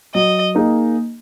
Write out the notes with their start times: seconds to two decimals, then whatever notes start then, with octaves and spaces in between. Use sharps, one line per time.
0.14 F#3 D#5
0.55 A#3 D#4 G#4